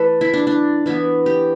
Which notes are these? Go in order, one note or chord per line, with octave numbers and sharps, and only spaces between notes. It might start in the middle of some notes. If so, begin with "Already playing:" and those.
Already playing: E3 A3 A4 B4 D5
E4
D4
D4
E3 B3 E4
G4